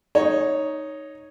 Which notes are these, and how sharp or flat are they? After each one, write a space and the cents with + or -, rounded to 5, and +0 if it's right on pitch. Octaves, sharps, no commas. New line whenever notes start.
D#4 +0 C#5 +0